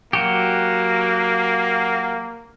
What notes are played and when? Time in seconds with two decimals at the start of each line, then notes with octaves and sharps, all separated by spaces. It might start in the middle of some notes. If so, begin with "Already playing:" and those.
0.13 F#3 A#3 F#4 G4